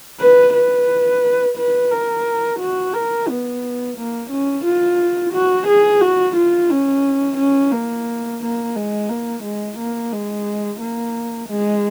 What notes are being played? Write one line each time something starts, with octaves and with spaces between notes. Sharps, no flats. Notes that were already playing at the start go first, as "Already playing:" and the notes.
B4
B4
B4
A#4
F#4
A#4
B3
A#3
C#4
F4
F#4
G#4
F#4
F4
C#4
C#4
A#3
A#3
G#3
A#3
G#3
A#3
G#3
A#3
G#3